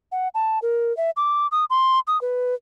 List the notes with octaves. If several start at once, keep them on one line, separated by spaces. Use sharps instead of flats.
F#5
A5
A#4
E5
D6
D#6
C6
D#6
B4